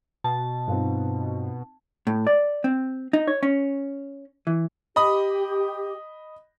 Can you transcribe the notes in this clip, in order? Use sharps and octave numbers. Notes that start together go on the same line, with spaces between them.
B2 A5
G2 C4 D#4 F4
A2
D5
C4
D#4
C#5
C#4
E3
G4 D#5 B5 D#6